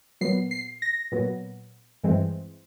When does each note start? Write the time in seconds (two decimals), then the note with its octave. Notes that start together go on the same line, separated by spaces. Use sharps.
0.21 A#2 F#3 B3 C7
0.51 C7
0.82 A#6
1.12 A#2 F#3 B3
2.04 G2 E3 G#3 C4